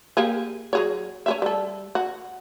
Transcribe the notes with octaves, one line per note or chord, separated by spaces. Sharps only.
A#3 G4 G#4
F#3 G#4 C#5
C#4 G#4 E5
G3 A4
F#4